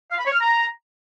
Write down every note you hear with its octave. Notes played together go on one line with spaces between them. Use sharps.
F5
B5
C#5
F6
A#5